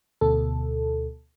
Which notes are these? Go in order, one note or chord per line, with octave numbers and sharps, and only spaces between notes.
D2 B2 A4